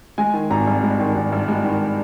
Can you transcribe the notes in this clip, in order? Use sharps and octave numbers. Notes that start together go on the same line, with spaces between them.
G#3 G#5
D#3
G#1 A#5
G2
G#3
D#3
G#1
G2
G#3
D#3